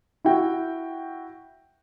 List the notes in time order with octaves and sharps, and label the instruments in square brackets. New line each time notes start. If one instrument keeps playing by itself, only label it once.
[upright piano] E4 F#4 G5